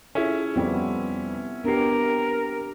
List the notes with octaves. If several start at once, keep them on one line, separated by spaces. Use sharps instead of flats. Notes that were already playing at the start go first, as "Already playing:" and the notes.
C#4 E4 F4 G#4 A4
F2 G3 B3 C4
B3 D4 G4 A#4 C7